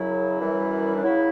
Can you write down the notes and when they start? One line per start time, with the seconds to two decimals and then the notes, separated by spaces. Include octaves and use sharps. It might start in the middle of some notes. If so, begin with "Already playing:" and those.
Already playing: F#2 C#3 F#3 E4
0.40 F#2 E3 G3
0.95 D4
1.04 C#3 F#3 E4